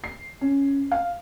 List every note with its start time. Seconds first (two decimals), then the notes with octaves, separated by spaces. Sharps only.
0.04 C7
0.41 C#4
0.92 F5